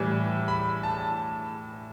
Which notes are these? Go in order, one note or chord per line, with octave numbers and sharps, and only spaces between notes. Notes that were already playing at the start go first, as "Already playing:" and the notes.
Already playing: A2 E3 G3
B5
A5